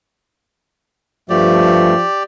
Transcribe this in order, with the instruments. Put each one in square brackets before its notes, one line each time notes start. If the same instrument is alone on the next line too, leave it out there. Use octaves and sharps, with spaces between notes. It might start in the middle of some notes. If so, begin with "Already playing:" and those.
[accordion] G2 A3 [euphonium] F3 [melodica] G4 D5